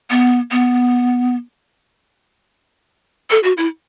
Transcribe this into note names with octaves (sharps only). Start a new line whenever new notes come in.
B3
B3
A4
F#4
E4